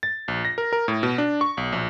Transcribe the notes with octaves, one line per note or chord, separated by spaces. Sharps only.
A6
A#1
A#6
A#4
A#4
A2
B2
D4
C#6
B1
A#1